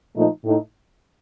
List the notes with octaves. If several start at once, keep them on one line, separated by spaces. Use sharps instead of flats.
A#2 F3 A3 D#4
A2 A3 D#4